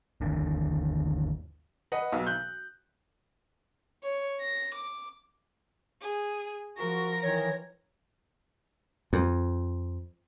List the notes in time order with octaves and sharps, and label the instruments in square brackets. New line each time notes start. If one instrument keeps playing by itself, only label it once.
[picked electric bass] G1 D#2 D3
[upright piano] B4 D#5 F#5
B1
F#6 G6
[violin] C#5
A#6
D6
[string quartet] G#4
[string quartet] F3 A#4 A#6 [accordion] F#4
[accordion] D#3 E3 [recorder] C#5
[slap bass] F2